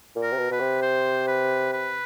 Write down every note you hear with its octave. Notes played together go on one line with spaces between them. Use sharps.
A#2
A#4
C3
B2
B2 B4
C3
C5
B4
B4